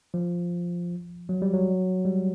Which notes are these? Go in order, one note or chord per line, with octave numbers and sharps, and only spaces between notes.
F3
F#3
G3
F#3
G3